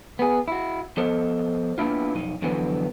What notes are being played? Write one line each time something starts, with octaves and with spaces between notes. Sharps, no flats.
B3 G#4
E4 F#4
F3 B3 A4 C5 D#5
A#3 B3 D4 E4 F4
B1 F2 D#4
F2 D3 E3 F#3 B3 C4